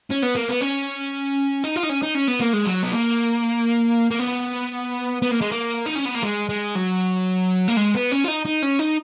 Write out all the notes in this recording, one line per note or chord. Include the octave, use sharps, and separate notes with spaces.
C#4
B3
A#3
B3
C#4
D#4
F4
D#4
C#4
D#4
C#4
B3
A#3
G#3
F#3
B3
A#3
A#3
B3
B3
A#3
G#3
A#3
D#4
C#4
B3
A#3
G#3
G#3
F#3
A#3
G#3
B3
C#4
F4
D#4
D#4
C#4
D#4